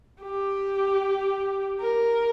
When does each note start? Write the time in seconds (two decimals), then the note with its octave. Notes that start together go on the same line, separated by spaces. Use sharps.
0.22 G4
1.81 A#4